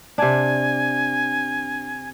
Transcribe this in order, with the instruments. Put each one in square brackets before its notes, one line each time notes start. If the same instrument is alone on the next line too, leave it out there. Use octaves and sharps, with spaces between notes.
[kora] C3 D4 [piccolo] G#5